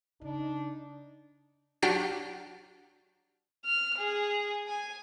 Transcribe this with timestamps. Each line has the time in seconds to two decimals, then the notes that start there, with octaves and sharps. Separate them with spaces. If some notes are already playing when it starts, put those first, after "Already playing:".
0.21 C#3 D4 D#4
1.82 F#3 D4 G4 F6 G6
3.65 F6
3.98 G#4
4.67 G#5